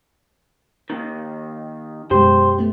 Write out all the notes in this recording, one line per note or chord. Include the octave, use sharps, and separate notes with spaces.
D#2 D#3
F#2 B2 G#3 G4 C5
A3 B3